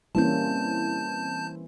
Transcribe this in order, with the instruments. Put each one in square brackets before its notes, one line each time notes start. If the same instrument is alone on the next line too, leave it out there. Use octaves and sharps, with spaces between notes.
[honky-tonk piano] E3 C4 E4 [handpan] G3 A#3 C#4 [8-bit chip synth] A5 G6